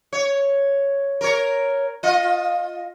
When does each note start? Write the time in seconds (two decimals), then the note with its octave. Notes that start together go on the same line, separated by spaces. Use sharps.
0.13 C#5
1.21 A#4 C#5
2.03 F4 D#5